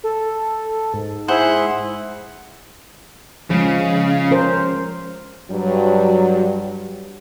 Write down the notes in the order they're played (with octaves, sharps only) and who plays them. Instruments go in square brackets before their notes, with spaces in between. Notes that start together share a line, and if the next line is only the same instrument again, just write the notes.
[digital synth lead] A4
G#2
[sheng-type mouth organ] E4 G#4 [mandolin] C5 [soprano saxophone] F#5
[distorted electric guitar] C#3 [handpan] F3 G#3
[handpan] C#4 A#4 C5
[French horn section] G2 F#3